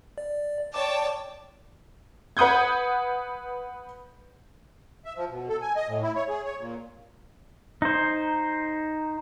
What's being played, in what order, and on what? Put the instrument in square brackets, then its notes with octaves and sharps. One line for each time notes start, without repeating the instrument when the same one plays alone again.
[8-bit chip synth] D5
[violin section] C#5 G5 A5 [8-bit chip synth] D5 D6
[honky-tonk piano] B4 F#5 D#6 G6 G#6
[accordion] E5
F3
B2
A4
G#5
D#5
A2
E4
C#5
G#4
C#5
A#2
[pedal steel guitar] D#4 C5